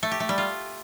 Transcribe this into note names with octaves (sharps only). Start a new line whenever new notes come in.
A3
G4
A3
G3
F4